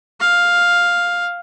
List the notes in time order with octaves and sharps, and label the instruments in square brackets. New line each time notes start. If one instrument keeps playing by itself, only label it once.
[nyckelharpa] F5